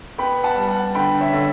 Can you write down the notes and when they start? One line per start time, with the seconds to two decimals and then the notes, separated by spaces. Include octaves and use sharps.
0.18 B3 G5 B5
0.43 F#5 A5
0.56 G3
0.69 F#5 A5
0.95 D3 G5 B5
1.20 C#5 E5
1.33 D3